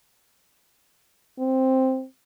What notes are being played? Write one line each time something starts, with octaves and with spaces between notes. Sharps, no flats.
C4